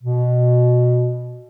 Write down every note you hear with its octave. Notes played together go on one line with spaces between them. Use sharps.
B2